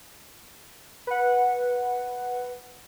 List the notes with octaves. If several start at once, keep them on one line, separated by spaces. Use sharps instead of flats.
B4 F#5